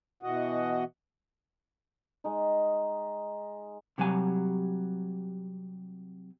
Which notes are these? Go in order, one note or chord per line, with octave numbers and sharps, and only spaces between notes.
B2 E3 F#4 D#5 F#5
G#3 D#4
C3 F#3 G3 G#5